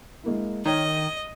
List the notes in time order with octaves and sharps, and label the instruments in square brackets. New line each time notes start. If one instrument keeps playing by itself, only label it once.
[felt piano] G#3 A#3 E4
[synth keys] D#3 [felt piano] C#5 G5 G#6 [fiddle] D#5
[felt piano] D#7